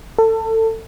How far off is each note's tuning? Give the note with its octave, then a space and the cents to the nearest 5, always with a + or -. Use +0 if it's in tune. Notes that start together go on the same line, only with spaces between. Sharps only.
A4 +25